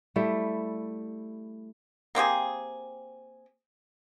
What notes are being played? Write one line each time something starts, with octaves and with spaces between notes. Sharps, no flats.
G3 A3 E4
A#3 C4 G4 G#4